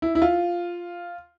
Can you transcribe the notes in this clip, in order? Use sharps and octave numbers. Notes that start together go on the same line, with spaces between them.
E4
E4
F4